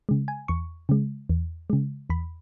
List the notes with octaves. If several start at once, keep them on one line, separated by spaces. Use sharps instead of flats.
C#3 G#3
G#5
E2 C#6
C#3 G#3
E2
C#3 G#3
E2 B5